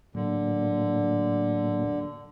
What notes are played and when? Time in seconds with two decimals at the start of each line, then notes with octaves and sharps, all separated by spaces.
0.15 A2 D3 F#3 A#3